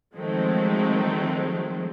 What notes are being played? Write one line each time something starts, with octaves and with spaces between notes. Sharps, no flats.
D#3 F3 F#3 G#3 A3 C4